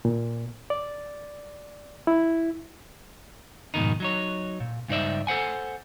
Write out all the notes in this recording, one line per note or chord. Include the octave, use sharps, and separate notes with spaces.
A#2
D5
E4
F2 G#2 B2 D#3 D#4
F#3 D#4 C#5
A#2
C#2 G2 D#4 C5 D5 E5
A4 C5 F#5 G#5